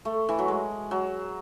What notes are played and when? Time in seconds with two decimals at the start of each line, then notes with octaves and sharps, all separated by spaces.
0.05 A3
0.29 E3
0.39 F#3
0.48 G#3
0.91 F#3